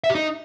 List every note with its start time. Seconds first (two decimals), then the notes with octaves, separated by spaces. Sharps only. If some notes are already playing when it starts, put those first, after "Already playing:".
0.04 E5
0.10 G4
0.15 D#4